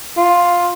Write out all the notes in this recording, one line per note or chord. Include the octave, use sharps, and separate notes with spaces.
F4